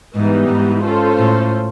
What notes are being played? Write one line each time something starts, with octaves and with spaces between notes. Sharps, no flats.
G#2 E3 G3 B3 D#4
G#2
C#4 F4 A4 C5
A2